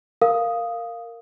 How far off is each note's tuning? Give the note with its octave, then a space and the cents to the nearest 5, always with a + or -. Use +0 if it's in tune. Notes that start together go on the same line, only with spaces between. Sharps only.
A#4 -15 F5 +0 D#6 +0